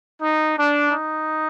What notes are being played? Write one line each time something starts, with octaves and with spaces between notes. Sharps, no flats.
D#4
D4
D#4